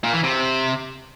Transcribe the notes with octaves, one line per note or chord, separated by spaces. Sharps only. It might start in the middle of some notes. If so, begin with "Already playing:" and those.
A#2
E3
C3